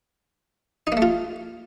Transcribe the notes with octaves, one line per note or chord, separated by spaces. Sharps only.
D#4
A#3
A3
F4